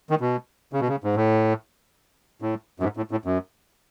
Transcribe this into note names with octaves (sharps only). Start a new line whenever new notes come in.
D#3
B2
C#3
B2
C#3
G#2
A2
A2
F#2
G#2
A2
A2
F#2